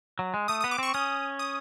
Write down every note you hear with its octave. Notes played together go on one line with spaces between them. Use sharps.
F#3
G#3
A3 D#6
D#6
B3
D6
C4 C#6
C#4 D#6
D#6